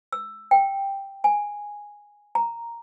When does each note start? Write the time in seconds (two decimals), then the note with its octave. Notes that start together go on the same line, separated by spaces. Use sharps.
0.13 E6
0.51 G5
1.24 G#5
2.35 A#5